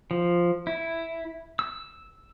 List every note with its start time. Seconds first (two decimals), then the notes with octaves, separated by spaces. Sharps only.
0.11 F3
0.67 E4
1.59 E6